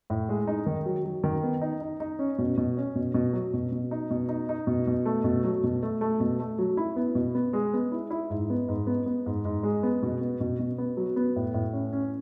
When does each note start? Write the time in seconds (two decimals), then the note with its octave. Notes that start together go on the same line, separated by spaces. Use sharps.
0.10 A2
0.29 G#3
0.47 D#4
0.66 D#3
0.86 F#3
1.05 F#3
1.24 D#3
1.43 B3
1.61 D#4
1.81 D#4
2.00 D#4
2.19 C#4
2.38 B2
2.57 B2
2.77 C#4
2.95 B2
3.14 B2
3.33 F#3
3.54 B2
3.71 B2
3.91 D#4
4.11 B2
4.29 D#4
4.49 D#4
4.67 B2
4.87 B2
5.05 A3
5.24 B2
5.44 F#3
5.63 B2
5.83 A3
6.01 A3
6.20 B2
6.39 A3
6.59 F#3
6.77 E4
6.96 B3
7.15 B2
7.35 B3
7.53 G#3
7.74 B3
7.91 E4
8.10 E4
8.30 G#2
8.50 B3
8.68 G#2
8.87 B3
9.06 B3
9.26 G#2
9.45 G#2
9.63 G#3
9.83 B3
10.03 B2
10.21 B3
10.40 B2
10.59 B2
10.78 B3
10.97 F#3
11.16 B3
11.36 A2
11.54 A2
11.73 C#4
11.93 C#4